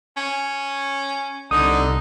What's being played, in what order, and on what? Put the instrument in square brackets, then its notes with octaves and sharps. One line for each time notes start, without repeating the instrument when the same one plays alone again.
[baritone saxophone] C#4
[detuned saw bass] C2 [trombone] D3 [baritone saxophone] D#4 [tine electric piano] D#6